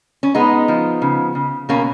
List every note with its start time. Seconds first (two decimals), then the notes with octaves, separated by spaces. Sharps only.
0.23 C#4
0.35 G#3 B3 D#4
0.68 F3
1.02 C#3
1.35 C#3
1.69 B2 A#3 C#4